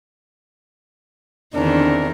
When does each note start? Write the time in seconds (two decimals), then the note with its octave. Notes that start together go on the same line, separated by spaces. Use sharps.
1.55 E2 D3 D#3 C4 D4 A#4